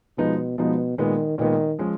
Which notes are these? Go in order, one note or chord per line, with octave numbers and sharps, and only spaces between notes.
B2 F3 G#3 B3 D#4
B2 F3 G#3 B3 D#4
A#2 D#3 G#3 B3
A#2 D#3 G#3 B3
F3 G#3 C#4